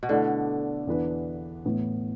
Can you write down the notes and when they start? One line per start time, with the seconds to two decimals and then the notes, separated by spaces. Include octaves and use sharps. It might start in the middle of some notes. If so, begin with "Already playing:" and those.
0.03 B2
0.09 D3 A3 E4 A4 D5
0.87 E2 E3 B3 D4 B4
1.65 A2 E3 B3